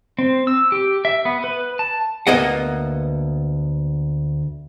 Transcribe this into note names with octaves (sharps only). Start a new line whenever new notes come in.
C4
E6
G4
E5
B3
B4
A5
D2 A#3 B3 D#5 F#5